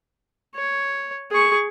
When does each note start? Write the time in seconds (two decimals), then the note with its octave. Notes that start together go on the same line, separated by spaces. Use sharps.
0.56 C#5
1.31 G#4 C#6